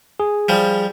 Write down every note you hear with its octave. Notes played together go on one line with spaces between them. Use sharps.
G#4
F3 G3